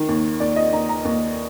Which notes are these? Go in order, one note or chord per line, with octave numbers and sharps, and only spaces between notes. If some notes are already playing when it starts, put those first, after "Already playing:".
Already playing: D#3
D#2
D#2 D5
D#5
D#2 A#5
A#5
D#2